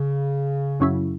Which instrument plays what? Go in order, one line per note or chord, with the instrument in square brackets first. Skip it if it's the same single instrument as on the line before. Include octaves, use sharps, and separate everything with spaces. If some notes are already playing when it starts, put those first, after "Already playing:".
Already playing: [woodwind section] C#3
[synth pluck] F#2 F#3 C#4 E4